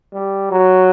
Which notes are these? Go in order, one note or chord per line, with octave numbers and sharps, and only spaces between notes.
G3
F#3